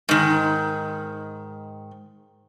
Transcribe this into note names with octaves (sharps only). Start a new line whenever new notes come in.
G#2 D#3